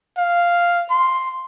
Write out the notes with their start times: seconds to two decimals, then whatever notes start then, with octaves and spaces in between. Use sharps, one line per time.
0.18 F5
0.90 C6